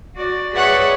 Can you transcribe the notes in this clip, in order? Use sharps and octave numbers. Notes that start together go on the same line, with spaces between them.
F#4 D5
G#4 B4 C#5 D5 E5 F#5